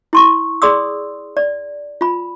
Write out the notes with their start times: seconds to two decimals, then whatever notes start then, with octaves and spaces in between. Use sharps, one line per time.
0.13 E4 C6 C#6
0.62 G#4 D5 C6 D#6 E6
1.37 D5
2.01 F4 B5